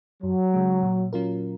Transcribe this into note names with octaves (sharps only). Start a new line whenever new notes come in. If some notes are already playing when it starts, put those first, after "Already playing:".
F#2 F#3
C#3 G#3
A#2
F#3 C#4 F4 A#4